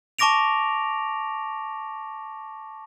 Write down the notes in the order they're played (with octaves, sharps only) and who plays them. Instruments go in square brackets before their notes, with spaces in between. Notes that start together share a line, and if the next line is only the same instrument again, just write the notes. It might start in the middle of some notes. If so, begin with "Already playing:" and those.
[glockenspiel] A5 C#6 D6 A#6 D7 F7